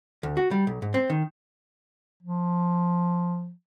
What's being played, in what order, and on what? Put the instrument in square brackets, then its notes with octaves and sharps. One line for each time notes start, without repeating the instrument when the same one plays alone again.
[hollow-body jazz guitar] D2
F#4
G3
B1
G#2
C4
D#3
[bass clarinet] F3